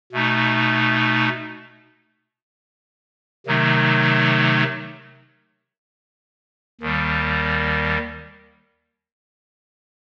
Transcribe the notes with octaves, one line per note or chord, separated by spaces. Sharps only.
B2 A3 D#4
C3 D#3 F#3 A3 D#4
D#2 D#3 G3